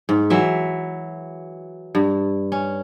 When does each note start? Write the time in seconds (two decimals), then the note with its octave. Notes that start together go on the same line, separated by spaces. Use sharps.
0.09 G#2
0.30 E3 F#3 E5
1.95 G2
2.52 C#4